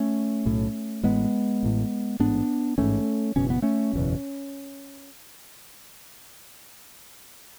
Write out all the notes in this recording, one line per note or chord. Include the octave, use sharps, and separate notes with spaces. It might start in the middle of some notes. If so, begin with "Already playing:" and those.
Already playing: A3 C#4
B1 A2
A1 A2 G#3 B3
A1 A2
A1 G#2 B3 D4
A1 G#2 A3 C#4
F#1 E2 B2 C#4
B3
A3 C#4
F#1 E2 B2